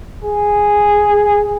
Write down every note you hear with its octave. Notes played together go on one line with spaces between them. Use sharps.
G#4